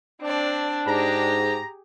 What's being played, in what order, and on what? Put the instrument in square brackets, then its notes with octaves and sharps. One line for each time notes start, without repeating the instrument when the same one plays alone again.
[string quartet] C4 D5 [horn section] D4
[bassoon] G#2 [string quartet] G4 G#4 [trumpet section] A#5